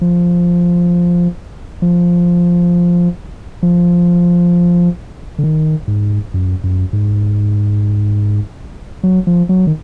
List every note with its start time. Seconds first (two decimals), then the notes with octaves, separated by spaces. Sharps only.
0.01 F3
1.82 F3
3.63 F3
5.39 D3
5.44 D#3
5.88 G#2
6.34 F#2
6.64 F#2
6.93 G#2
9.03 F#3
9.27 F3
9.49 F#3
9.67 D#3